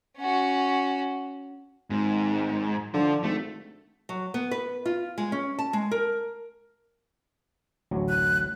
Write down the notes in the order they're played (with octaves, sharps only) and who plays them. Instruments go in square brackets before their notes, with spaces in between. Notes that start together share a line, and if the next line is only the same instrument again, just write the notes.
[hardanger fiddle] C#4 F#4
[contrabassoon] G#1 [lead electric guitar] G#2
[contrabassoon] D3 [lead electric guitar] F3
[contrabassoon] G#1 [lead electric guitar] A3
[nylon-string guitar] F#3
B3
B4
F4
G#3
C#4
A5
G#3
A#4
[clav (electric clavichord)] A1 D2 F#3
[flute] F#6